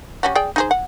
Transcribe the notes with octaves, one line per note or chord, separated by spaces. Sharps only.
G3 C#4 F#4
G#4 D5 G5
D#4 G#4 C5
F#5